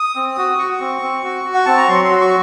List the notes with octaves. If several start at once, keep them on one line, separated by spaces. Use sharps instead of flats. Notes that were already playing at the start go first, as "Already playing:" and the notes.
Already playing: D#6
C4
F#4
F#4 C#6
C4
C4
F#4
F#4
F#5
C4 A5
A#5
F#3 C6
C6
F#4
C#6